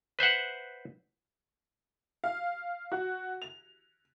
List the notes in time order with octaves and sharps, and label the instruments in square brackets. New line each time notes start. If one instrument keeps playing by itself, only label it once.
[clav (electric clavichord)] B4 C5 E5 F#5
[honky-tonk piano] F5
F#4
F7